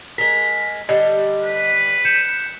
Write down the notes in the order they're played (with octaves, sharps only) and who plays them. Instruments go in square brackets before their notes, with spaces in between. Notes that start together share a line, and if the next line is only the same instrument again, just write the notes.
[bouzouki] G#3 A#4 [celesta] B6
[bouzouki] D3 G3 [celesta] D#5
[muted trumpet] B4
[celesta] G6 C#7 E7